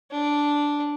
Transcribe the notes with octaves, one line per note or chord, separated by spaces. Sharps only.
D4